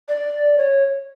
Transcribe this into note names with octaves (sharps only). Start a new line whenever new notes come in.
D5
C#5